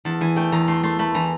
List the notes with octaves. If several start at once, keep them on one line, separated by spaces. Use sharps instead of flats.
E2 A5
E3 G#5
A3 G5
E2 A#5
A3 C6
A3 C6
A3 B5
E3 A#5